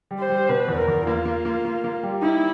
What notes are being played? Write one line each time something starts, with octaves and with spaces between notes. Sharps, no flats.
G3
C5
G3
B2 B4
E2
A#4
E2
A#3 F4
A#3
A#3
A#3
A#3
G3
D#4 E4